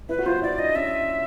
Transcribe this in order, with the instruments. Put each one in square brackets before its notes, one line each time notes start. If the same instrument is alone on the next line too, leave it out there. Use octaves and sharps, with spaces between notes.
[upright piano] E4 [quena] B4
[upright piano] F#4
[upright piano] F4 [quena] C5
[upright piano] E4 [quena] D5
[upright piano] D4 [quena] D#5
[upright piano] C#4 [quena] E5